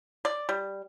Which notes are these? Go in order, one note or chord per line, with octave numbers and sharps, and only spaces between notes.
D5
G3